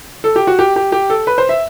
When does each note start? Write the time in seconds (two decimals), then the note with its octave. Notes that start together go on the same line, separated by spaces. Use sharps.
0.24 A4
0.36 G4
0.47 F#4
0.59 G4
0.76 G4
0.92 G4
1.10 A4
1.27 B4
1.38 C5
1.49 E5